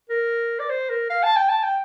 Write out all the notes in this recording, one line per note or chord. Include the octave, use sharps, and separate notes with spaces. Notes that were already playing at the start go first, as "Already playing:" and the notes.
A#4
D5
C5
A#4
F5
A5
G5
A5
G5